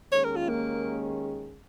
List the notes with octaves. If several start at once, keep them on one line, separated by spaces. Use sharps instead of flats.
D#2 D#3 G#3 C#4 G#4 C#5
A#4
F4
A#3